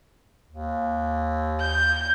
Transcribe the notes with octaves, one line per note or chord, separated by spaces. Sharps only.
D#2
G6